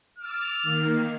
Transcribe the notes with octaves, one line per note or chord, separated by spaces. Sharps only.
D6 E6 F6 A6
D#3 A#3